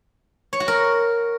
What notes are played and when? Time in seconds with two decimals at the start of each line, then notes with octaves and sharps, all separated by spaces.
0.53 C#5
0.60 F#4
0.68 A#4